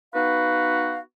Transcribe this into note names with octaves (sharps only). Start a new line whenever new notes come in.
B3 D#4 F#4 B4 F5